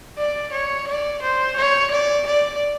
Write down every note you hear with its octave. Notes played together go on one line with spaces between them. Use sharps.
D5
C#5
D5
C5
C#5
D5
D5